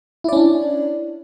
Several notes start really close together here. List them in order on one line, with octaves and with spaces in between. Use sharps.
E4 D5 C#4 D4